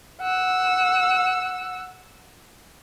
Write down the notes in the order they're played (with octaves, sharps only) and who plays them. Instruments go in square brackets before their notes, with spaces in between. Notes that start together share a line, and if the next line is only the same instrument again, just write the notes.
[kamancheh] F#5 E6